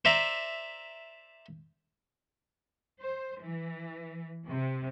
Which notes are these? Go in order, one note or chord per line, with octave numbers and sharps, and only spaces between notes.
C5 D5 E5 A#5
C5
E3
C3